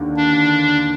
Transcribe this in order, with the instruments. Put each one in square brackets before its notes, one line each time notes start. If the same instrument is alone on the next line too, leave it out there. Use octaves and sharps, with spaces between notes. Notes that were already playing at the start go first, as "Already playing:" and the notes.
Already playing: [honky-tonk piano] D#2 D3
[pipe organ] D4